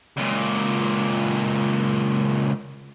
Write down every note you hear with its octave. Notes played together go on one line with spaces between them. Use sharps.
C#2 A#2